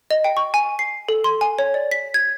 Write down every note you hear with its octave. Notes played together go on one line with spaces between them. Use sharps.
D#5
G5
C#6
G#5
C7
A4
C6
G#5
C#5
D5
B6
G#6